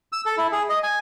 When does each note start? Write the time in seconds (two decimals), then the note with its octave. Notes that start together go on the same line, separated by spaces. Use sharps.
0.12 E6
0.26 A4
0.37 E4
0.52 G#4
0.70 D#5
0.83 G#5